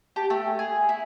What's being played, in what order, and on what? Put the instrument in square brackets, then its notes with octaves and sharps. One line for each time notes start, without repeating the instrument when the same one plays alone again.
[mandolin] G4 [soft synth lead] A5
[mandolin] A3 [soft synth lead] G5
[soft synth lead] G#5
[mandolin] G#4
E4